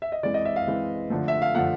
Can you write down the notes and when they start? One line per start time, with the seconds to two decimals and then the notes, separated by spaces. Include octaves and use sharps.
0.02 E5
0.12 D#5
0.23 E3 G#3 C4 D5
0.34 D#5
0.45 E5
0.56 F5
0.67 E3 G#3 C4
1.10 D3 F3 A3
1.28 E5
1.42 F5
1.55 D3 F3 A3 F#5